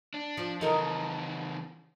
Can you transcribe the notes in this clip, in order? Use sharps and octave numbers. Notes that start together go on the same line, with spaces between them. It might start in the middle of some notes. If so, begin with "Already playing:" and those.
D4
F3 F4
C#3 E3 D#4 A4 A#4